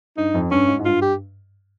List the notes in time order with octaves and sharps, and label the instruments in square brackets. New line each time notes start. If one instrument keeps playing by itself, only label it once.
[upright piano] G2 [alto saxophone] D#4
[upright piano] F2
[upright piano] G2 [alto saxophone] C#4
[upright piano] G#2
G#2
[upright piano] G2 [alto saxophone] F4
[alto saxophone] G4